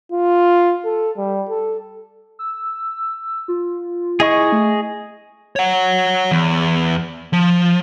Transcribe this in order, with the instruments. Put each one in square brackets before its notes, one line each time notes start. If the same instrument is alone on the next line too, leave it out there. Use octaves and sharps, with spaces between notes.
[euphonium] F4
A4
G3
A4
[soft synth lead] E6
F4
[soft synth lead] E4 [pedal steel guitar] G#4 D#5 C#6
[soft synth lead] A3
[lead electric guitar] C#5 F#5
E2
F3